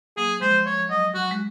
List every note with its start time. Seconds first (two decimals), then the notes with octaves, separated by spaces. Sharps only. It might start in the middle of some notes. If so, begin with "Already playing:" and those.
0.17 F#3 A#3 G#4
0.41 F3 G#3 C5
0.66 F3 C#5
0.89 F#3 D#5
1.14 F#3 F#4
1.31 G#3